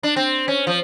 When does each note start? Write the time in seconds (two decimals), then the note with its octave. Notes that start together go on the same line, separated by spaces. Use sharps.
0.03 D4
0.16 C4
0.48 C#4
0.67 F3